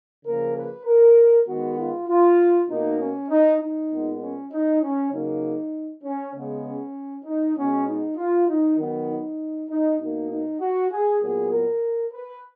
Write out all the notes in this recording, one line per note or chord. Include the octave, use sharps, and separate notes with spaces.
C#3 F3 A#3 A#4
B4
A#4
D#3 G#3 B3 F#4
F4
F4
B2 A#3 D#4
C#4
D#4
D#4
A#2 G#3 B3
C#4
D#4
C#4
C#3 F#3 A#3 D#4
C#4
C#3 G#3 B3
C#4
D#4
B2 G#3 B3 C#4
D#4
F4
D#4
D#3 F#3 B3
D#4
D#4
B2 A#3 D#4
D#4
F#4
G#4
A#2 F#3 B3 G#4
A#4
B4